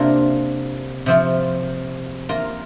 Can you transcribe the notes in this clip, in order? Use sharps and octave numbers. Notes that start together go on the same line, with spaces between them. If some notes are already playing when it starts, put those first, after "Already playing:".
Already playing: C3 A#3 D4 F4 A#4
C3 F3 C4 F4
A#3 F4 A#4